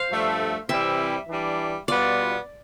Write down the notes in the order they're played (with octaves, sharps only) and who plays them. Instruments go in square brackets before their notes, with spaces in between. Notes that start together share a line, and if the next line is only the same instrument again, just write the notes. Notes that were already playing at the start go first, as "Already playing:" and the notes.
Already playing: [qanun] C5 F5
[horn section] G2 F3 A3 D4
[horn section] C3 E3 G3 C4 E4 [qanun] E5
[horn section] E3 G3 D4
[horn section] B2 G3 B3 F4 [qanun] D5